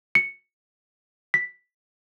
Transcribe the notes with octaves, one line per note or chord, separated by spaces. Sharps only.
C#7
B6